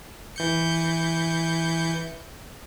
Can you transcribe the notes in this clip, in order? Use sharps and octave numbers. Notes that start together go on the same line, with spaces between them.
E3 G6 C#7